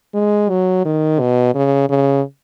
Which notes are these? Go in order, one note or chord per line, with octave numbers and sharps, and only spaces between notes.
G#3
F#3
D#3
B2
C#3
C#3